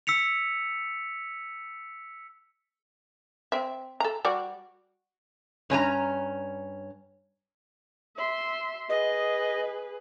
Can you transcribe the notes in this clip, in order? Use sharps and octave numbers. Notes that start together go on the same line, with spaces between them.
E6 B6 C#7 F7
C4 E5
A4 A#5
G3 F#4 D5
G2 C#4 D4 A#5
E5 C6
G#4 B4 D#5